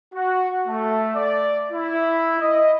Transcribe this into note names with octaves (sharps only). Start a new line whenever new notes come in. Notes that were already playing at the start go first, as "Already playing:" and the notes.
F#4
A3
D5
E4
D#5